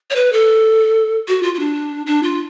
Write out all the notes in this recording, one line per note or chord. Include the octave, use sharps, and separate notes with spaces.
C#5
B4
A4
F#4
F4
F4
D4
D4
F4